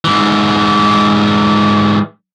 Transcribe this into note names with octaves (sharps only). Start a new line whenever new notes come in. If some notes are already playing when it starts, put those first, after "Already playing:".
G#2 E3